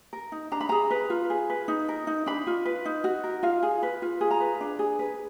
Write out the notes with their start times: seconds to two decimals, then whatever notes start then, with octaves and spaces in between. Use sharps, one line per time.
0.13 A#4
0.32 D#4
0.52 D4 A#5
0.61 B5
0.69 G#4 A#5
0.91 B4
1.10 F4
1.30 G#4
1.50 B4
1.68 D#4
1.89 A#4
2.07 D#4
2.26 D4 B5
2.47 F4
2.65 B4
2.85 D#4
3.04 F#4
3.24 A#4
3.43 F4 F5
3.63 G#4
3.83 B4
4.02 F4
4.21 G#4
4.31 A#5
4.40 B4
4.61 D4
4.79 G#4
4.99 B4